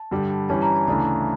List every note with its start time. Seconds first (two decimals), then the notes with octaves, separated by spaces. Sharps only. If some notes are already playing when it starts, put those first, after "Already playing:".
Already playing: A5
0.11 G2 D3 G3
0.49 G2 E3 G3 C#4 A5
0.62 A#5
0.75 A5
0.88 D2 C#3 E3 A3 D4 A5